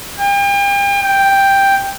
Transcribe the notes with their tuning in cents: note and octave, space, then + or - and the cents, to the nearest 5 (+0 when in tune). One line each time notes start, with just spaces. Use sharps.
G5 +40
G5 +5